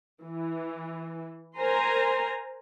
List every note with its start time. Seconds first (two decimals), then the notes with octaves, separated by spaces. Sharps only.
0.25 E3
1.59 A#4 C5 G#5 A#5 C6